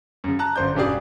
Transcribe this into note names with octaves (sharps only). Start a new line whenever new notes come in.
F#2 C#3
A5 A#5 F#6
G1 F#2 C5 D5 G6
E1 G2 C#3 G4 G#4 D5